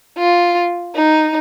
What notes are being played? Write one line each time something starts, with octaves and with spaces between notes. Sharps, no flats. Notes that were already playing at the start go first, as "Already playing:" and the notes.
F4
D#4